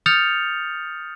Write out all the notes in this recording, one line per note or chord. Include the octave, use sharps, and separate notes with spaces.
D#6 F6 G6 A6 C#7 F7